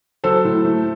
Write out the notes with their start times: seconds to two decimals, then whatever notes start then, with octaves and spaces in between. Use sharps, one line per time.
0.24 F#3 A4 C5
0.44 A2
0.65 A3